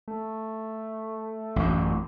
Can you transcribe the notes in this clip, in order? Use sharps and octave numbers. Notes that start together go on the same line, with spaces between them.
A3
A1 F#2